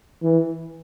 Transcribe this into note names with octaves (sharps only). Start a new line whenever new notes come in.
E3